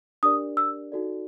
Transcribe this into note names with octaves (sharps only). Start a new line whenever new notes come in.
D4 G4 A#4 D5 D#6
E6
D#4 F#4 A4 D5